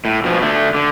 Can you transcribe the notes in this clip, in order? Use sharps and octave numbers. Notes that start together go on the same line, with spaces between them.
A2
B2 F3
D3 A3
D3